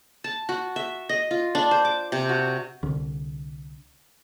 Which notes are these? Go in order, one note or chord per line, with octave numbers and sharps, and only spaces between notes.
A5
F#4
E5
D#5
F4
D4
C5
D6
C3
F#4
C2 D3